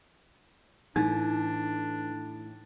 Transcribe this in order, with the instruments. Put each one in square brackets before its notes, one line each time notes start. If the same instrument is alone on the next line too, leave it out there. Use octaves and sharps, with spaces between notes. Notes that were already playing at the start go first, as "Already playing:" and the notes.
[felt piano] A2 A6 [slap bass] E3 [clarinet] D4 [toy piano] D#4